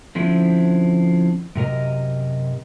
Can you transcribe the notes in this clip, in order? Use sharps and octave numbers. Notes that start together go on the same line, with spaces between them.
D3 F3 C4 C#4 E4
F#2 C3 A#4 D#5